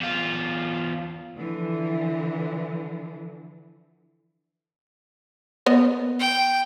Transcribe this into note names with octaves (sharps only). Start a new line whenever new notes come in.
E2 F4
D3 E3 F3
B3 A#4 D#5
G5